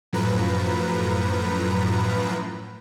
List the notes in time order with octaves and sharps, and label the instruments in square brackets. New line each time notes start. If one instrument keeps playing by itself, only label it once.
[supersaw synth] F#2 A2 F3 B4 A#5